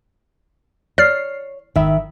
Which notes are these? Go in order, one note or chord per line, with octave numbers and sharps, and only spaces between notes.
C#5 D5 F6 C7
G#1 D#3 E5 B5